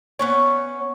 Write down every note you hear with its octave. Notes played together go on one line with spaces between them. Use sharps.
B3 C#4 C#5